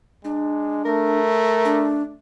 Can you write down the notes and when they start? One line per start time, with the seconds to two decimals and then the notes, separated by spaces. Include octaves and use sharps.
0.24 G#3 D4
0.86 A3 A#4
1.65 D4